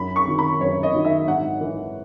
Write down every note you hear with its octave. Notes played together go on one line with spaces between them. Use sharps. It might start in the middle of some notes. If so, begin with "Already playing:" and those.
Already playing: F#2 B5
C#6
D#3 F#3
B5
F#2 C#5
D#5
D#3 F#3
E5
G#2 F#5
E3